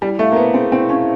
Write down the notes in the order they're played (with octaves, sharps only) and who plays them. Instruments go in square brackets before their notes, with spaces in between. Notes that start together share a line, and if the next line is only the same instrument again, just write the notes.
[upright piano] G3 [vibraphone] E4
[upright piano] A3 [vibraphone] F5
[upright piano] A#3
[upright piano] B3 [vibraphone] C5
[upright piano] C4 [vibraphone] G#4
[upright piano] C4 [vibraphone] E4
[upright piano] C#4 [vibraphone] F5